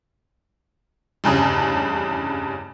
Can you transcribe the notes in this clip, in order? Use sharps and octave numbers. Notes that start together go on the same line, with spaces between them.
F1 E2 G2 C#3